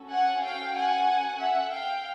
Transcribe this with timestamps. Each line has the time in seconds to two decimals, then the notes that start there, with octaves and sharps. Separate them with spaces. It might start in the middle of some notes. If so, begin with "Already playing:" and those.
Already playing: C#4 F#4 A4
0.09 F#5 G#5
0.41 F5 G5
0.74 F#5 G#5
1.38 E5 F#5
1.71 F5 G5